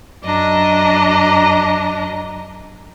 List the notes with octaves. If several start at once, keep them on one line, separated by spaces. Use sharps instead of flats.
F#2 D4 D#5 A#5